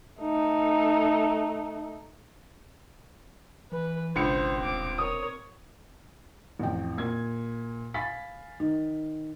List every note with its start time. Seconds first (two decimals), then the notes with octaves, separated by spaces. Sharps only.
0.21 A3 D#4
3.72 E3 B4
4.16 G#1 C#2 B2 D4 C5
4.60 D#1 C4 D6
4.98 A#4 C#5 D#6
6.59 A1 F2 G5
6.98 A#2 G#6
7.94 F5 G#5 B5 A6 B6
8.60 D#3